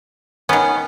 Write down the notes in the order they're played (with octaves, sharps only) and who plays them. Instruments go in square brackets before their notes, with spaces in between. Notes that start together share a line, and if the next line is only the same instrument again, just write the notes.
[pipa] D#3 C#4 [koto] B3